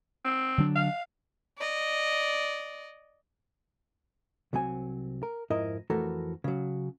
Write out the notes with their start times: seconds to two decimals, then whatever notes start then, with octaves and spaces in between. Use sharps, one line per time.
0.25 C4
0.58 D3 F#3 D4
0.76 F5
1.58 D5 D#5
4.53 C2 F#3 C4 G#5
5.23 A#4
5.50 F2 G#2 E4 A#4 D#5
5.90 F2 E3 A3 F#4 A4 A#4
6.44 C#3 F#3